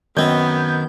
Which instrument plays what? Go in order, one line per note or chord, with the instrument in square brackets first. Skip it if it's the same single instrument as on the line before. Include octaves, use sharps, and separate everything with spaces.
[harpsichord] F#2 C4 [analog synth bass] D#3 [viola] B3 [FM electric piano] D#5 G6 G#6